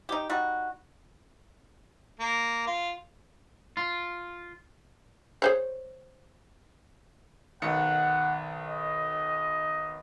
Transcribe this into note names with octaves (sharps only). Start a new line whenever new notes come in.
D#4 G4
G3 D#4 F#4
A#3
F4
F4
G#4 C5 C#5
B1 D#3 F#5 C#7
D#5